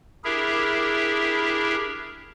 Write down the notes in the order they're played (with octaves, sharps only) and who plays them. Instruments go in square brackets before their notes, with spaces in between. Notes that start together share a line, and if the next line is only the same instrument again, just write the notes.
[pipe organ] D4 E4 G4 G#4 A#4 E5